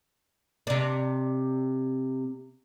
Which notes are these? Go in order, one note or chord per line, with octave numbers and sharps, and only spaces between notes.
C3 D4